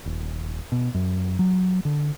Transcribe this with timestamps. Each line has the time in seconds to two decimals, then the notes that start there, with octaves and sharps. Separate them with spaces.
0.06 D#1
0.72 B2
0.94 F#2
1.39 F#3
1.85 D3